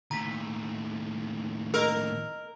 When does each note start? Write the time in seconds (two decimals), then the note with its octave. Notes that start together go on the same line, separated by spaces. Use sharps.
0.11 D#2 A2 A#5 B6
1.74 A#4 D#5 E6